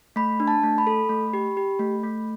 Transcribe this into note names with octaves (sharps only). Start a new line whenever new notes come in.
A3 B5
D4
A5
A3
B5
A4
A3
G4
G4
A3
A3